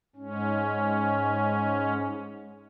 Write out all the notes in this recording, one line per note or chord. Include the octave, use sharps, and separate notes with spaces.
G#2 C#4